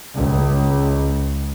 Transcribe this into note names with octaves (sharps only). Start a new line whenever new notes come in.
C#2